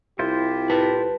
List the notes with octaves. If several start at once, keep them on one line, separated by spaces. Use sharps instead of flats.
C2 E4 F4 G4 C5
B4 A5